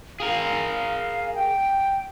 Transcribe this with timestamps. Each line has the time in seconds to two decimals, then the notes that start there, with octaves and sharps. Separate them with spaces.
0.20 G#4 A#4 F5
1.34 G5